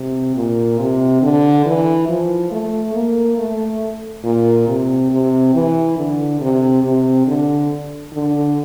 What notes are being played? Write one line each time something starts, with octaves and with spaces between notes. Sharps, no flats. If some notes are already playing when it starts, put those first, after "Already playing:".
Already playing: C3
A#2
C3
D3
E3
F3
A3
A#3
A3
A#2
C3
C3
E3
D3
C3
C3
D3
D3